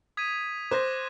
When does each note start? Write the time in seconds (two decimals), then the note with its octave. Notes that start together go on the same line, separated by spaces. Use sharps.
0.17 D#6 G#6 B6 D#7
0.71 C5 D6 F#6 A#6